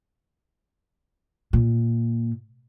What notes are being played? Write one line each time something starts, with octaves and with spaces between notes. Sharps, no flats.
A#2